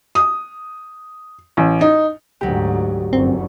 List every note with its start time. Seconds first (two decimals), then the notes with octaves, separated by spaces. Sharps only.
0.15 D#6
1.57 A1
1.81 D#4
2.41 D2 G#2 F#3 G4
3.13 G1 F#2 C4